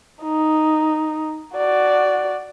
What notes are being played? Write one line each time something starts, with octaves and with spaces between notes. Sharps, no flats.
D#4
F#4 D5